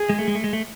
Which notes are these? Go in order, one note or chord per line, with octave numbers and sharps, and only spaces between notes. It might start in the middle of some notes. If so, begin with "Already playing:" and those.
Already playing: G#4
G#3
A3
G#3
A3
G#3
A3